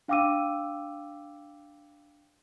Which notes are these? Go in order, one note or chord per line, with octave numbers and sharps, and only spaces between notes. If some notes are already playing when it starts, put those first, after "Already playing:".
D4 F5 G5 D6 E6 D#7